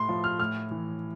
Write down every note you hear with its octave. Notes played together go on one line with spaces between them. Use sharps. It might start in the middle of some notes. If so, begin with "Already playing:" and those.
Already playing: A2 C6
F3
F6
A2 F6
E3